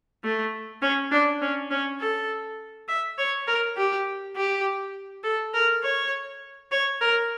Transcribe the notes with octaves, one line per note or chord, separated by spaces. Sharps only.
A3
C#4
D4
C#4
C#4
A4
E5
C#5
A#4
G4
G4
A4
A#4
C#5
C#5
A#4